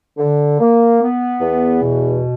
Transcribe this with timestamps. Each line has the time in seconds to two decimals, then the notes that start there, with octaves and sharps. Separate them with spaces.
0.18 D3
0.59 A#3
1.00 B3
1.41 E2
1.82 B2